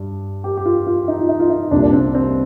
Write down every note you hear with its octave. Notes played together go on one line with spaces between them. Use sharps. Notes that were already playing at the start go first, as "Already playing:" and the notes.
Already playing: G2
G4
G4
F4
F4
D#4
F4
D#4
F4
D#4
C2 A#2 G3 A#3 D4
D4
C4
C4